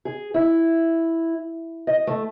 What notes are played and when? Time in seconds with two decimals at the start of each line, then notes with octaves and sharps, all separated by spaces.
0.05 G#4
0.34 E4
1.87 D#5
2.07 A3